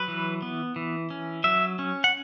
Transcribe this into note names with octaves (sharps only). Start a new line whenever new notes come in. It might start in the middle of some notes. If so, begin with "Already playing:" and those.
Already playing: F#3 B4
E3
B3
E3
C#4
F#3 E5
C#4
F#5